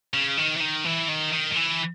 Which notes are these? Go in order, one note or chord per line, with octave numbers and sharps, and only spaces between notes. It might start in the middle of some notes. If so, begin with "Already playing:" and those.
C#3
D#3
E3
D#3
E3
D#3
D#3
D#3
E3